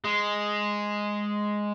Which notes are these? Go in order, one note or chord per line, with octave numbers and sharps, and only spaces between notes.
G#3